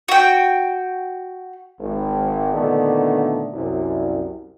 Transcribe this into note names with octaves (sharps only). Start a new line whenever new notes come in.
F#4 G5
G#1
A#2 D3 D#3 A3 B3 D4
C2 F#2